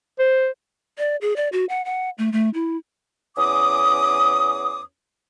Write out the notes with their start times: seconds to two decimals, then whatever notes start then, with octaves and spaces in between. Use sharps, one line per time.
0.19 C5
0.98 D5
1.21 G#4
1.36 D5
1.52 F#4
1.69 F#5
1.85 F#5
2.18 A3
2.32 A3
2.54 E4
3.36 E2 C#4 D6 D#6